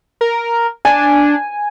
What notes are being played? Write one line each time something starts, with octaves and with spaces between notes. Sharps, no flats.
A#4
D4 G#5